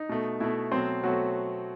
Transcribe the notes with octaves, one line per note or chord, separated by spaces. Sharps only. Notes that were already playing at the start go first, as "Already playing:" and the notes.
Already playing: D#4
B2 A3
B2 A3 E4
B2 F#3 A3 C4 C5
B2 F#3 A3 F#4